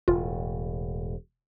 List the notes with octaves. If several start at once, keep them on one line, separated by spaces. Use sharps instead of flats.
E1 A2 F4